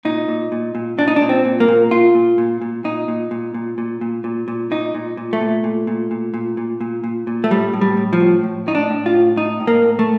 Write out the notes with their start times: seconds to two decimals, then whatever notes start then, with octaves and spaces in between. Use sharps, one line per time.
0.05 A#2 D#4
0.28 A#2
0.52 A#2
0.75 A#2
0.98 A#2 D4
1.08 D#4
1.16 D4
1.22 A#2
1.29 C4
1.45 A#2
1.60 A#3
1.68 A#2
1.91 A#2 F4
2.15 A#2
2.38 A#2
2.62 A#2
2.84 A#2 D#4
3.08 A#2
3.31 A#2
3.54 A#2
3.78 A#2
4.01 A#2
4.24 A#2
4.48 A#2
4.71 A#2 D#4
4.95 A#2
5.17 A#2
5.33 A3
5.41 A#2
5.64 A#2
5.87 A#2
6.11 A#2
6.34 A#2
6.57 A#2
6.81 A#2
7.04 A#2
7.27 A#2
7.44 A3
7.51 A2 G3
7.73 A2
7.81 G3
7.97 A2
8.13 F3
8.20 A2
8.43 A2
8.67 A2 D#4
8.75 D4
8.90 A2
9.06 F4
9.14 A2
9.36 A2 D#4
9.60 A2
9.67 A#3
9.83 A2
9.99 A3